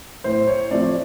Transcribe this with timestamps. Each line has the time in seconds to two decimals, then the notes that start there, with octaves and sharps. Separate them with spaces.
0.24 A2 C5
0.47 C#5
0.71 F3 A3 C4 D5